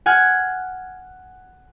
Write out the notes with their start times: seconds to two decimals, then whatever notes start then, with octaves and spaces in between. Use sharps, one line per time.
0.06 F#5 G#5 F6 G#6